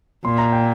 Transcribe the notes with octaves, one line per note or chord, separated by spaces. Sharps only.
A#2 C6
A#5
G5